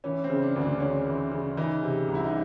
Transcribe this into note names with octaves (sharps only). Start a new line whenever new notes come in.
E3 C#4
C4
C#3
D4
D2
D4
D2 C#4
E3
C#3
E3 D#4
C3
C2
E4
D#4